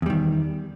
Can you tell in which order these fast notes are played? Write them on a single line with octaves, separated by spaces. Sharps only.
E2 G3 D#3